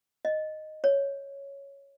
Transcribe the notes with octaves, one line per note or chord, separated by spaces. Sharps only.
D#5
C#5